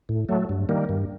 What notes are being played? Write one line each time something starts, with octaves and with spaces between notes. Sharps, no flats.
A2
F#3 A3
G2
D#3 G3 A#3
G2